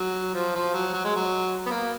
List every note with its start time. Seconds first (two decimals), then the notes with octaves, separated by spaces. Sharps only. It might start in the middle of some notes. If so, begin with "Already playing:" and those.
Already playing: F#3
0.35 F3
0.55 F3
0.74 F#3
0.93 F#3
1.04 G#3
1.16 F#3
1.66 B3
1.71 A#3